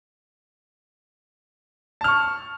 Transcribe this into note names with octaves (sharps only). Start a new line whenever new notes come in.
A5 C#6 F6